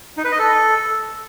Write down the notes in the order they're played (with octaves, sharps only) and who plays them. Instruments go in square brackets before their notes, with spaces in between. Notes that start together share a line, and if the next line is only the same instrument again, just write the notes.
[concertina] D#4
B4
D#5
A4